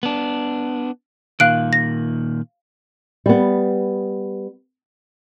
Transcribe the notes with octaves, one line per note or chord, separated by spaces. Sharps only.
B3 D4
A#2 D#3 F5 F#6 D7
A#6
G3 B3